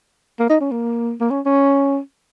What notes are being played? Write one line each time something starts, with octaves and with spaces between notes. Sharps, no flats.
A#3
D#4
C#4
A#3
A#3
C#4
C#4